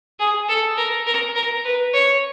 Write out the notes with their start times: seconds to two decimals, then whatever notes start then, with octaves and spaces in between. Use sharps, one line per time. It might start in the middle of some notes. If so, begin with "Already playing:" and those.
0.19 G#4
0.49 A4
0.77 A#4
1.07 A#4
1.35 A#4
1.65 B4
1.93 C#5